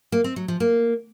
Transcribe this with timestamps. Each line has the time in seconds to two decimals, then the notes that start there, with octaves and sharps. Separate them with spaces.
0.12 A#3
0.24 C4
0.36 F#3
0.48 F3
0.60 A#3